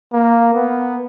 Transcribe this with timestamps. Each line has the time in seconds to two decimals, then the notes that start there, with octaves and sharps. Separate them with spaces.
0.13 A#3
0.54 B3